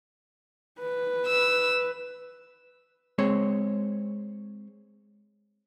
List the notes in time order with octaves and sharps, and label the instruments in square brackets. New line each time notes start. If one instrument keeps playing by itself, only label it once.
[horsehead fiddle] B4
[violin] E6
[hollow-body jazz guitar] G#3 C4 C#5